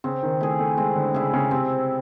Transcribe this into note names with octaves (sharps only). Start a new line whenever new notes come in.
C#3 C4
D#3
A3 E4 G#4
A3
G#3 C4
D3
C#3 E4 G#4
C#3
C3 C4